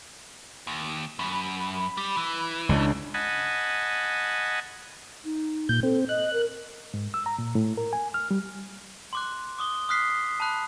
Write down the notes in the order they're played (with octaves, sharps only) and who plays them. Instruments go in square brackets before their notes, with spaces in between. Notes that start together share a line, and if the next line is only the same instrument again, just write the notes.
[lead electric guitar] D#2
[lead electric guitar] F#2 [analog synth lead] B5
[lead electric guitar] G3
E3
[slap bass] C#2 C#3 [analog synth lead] D4
[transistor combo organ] D#5 F#5 G#5 A5 B5
[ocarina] D#4
[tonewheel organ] A#2 G6
[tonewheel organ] C4 [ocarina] A4
[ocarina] D#5 [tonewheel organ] F#6
[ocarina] A#4
[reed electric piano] G#2
E6
A#5
A#2
A2
A#4
G#5
F6
G3
[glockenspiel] C6 D6 F#6
D6 D#6 G7
D#6 F6 F#6 B6 C7
A5 B5 F#6